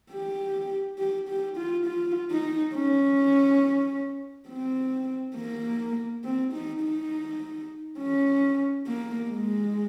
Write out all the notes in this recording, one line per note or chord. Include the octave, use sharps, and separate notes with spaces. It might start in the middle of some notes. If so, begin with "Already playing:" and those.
G4
G4
G4
F4
F4
D#4
C#4
C4
A#3
C4
D#4
D#4
C#4
A#3
G#3